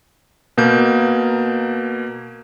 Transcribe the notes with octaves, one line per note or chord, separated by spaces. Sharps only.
B2 A#3 G6